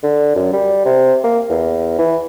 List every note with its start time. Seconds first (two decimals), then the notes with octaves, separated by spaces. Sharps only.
0.03 D3
0.36 F#2
0.53 G3
0.85 C3
1.24 A#3
1.50 E2
1.99 E3